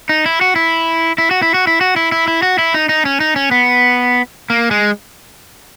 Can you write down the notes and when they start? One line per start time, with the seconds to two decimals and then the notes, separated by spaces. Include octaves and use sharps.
0.09 D#4
0.26 E4
0.41 F#4
0.56 E4
1.18 E4
1.31 F#4
1.42 E4
1.54 F#4
1.67 E4
1.81 F#4
1.96 E4
2.12 E4
2.28 E4
2.42 F#4
2.58 E4
2.74 D#4
2.89 D#4
3.05 C#4
3.20 D#4
3.36 C#4
3.51 B3
4.50 A#3
4.71 G#3